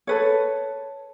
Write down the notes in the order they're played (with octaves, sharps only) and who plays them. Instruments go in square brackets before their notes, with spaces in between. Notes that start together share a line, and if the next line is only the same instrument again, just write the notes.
[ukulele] A4 B4 C#5